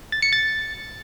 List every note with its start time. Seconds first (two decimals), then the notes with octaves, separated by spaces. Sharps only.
0.12 A6
0.22 C#7
0.33 A6